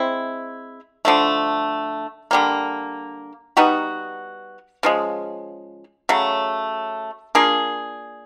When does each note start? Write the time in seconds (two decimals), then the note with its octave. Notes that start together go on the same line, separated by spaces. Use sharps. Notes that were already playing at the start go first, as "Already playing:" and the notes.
Already playing: G#3 C4 E4
1.05 D3 F3 A3
2.31 D3 G3 A#3
3.57 G3 B3 D#4 F#4
4.83 C#3 F3 G#3
6.09 C#3 F#3 A3
7.35 A#3 D4 F4 G#4